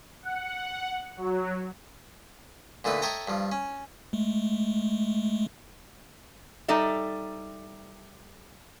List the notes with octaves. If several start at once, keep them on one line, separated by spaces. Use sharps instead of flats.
F#5
F#3
A#2 D3 A3 D#4 B4
A4 C#5 D#5 E5 G5 A#5
G2 F3
C#4
G#3 A3
G3 D#4 A4 D5 E5